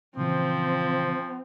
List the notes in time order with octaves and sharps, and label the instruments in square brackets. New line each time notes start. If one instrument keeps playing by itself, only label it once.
[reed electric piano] A#2 C#3 E3 [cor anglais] F3 [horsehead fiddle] C4